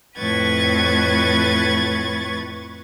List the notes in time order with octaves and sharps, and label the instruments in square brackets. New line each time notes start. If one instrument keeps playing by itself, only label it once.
[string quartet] F2 A2 B4 C#6 G#6 A6